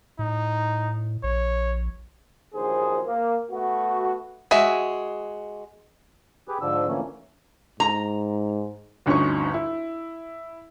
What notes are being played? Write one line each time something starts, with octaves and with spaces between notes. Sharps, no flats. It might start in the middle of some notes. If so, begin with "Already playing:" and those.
A2 D#4
A#1 C#5
A#1 D#2 F#3 G#4 C5
A#3
A3 B3 F#4
G#3 F#4 E5
G4 G#4 B4
G#2 D3 F3 D4 E6
D3 E3 F3 A3 A#3 C#4
G#2 A#5
G1 D2 C#4 D#4 C#6
E4